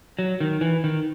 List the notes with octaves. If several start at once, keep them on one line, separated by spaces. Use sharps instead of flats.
F#3
D#3
E3
D#3